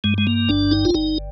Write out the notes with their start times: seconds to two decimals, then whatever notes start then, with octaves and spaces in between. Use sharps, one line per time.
0.04 G2 G#3
0.18 G#3
0.27 A#3
0.49 G1 D4
0.71 D#4
0.85 F4
0.94 G1 D#4